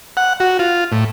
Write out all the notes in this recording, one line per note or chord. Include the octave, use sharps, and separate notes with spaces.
F#5
F#4
F4
A2